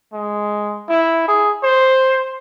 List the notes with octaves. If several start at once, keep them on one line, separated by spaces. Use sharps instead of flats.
G#3
E4
G#4
C5